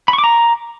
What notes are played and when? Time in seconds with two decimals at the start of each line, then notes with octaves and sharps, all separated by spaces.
0.08 B5
0.13 C#6
0.18 D6
0.24 A#5